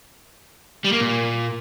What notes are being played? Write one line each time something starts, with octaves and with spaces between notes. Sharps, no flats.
G3
A#3
A#2